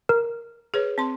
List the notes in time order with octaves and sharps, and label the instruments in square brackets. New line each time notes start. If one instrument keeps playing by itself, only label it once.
[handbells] A#4
[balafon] G#4 B4 C#5
C4 C6